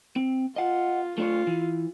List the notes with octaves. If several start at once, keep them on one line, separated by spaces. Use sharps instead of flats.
C4
F4 D#5 F#5
A3 D4 F4 C#5
E3